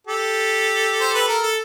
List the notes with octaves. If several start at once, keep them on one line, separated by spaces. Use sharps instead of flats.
G4 A4
C5
B4
A#4
A4